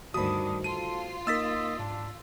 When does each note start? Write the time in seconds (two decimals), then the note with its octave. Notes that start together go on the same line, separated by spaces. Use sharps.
0.14 D2 G2 D#3 D4 F#4 C5 B5 D#6
0.64 F4 A4 D#7
1.27 A#3 D#4 A#4 D#5 E6 A6 B6
1.79 G#2 D4